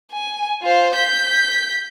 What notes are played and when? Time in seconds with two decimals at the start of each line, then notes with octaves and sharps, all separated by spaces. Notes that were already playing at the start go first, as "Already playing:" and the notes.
0.13 G#5
0.62 F4 C5
0.95 G6 B6